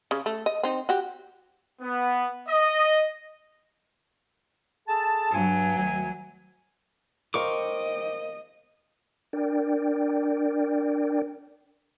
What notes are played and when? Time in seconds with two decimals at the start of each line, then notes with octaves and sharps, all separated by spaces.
0.11 C#3
0.26 A3
0.46 D#5
0.63 C4 D#4
0.89 F#4 G4
1.81 B3
2.48 D#5
4.88 G#4 A4 A5
5.33 G2 F#3 G#5
5.77 D2 D#3 G#5
7.34 A#4 C5 D#5 F5 G5 C#6 D6
9.33 D4 A#4 D5 G5